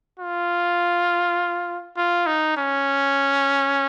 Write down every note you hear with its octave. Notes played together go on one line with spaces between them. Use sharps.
F4
F4
D#4
C#4